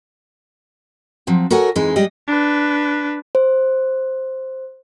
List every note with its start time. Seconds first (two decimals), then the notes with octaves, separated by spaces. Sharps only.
1.27 F3 F#3 C4
1.51 F#4 A4 A#4 C#5 F#5 G#5
1.76 F2 E3 G#3 D#4
1.96 G3 G#3 G4 D#5
2.28 D4 B4
3.35 C5